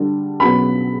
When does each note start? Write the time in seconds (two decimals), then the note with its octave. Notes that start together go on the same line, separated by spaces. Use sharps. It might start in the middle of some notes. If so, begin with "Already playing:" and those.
Already playing: D3 G3 D4
0.40 B2 F#3 C#4 B5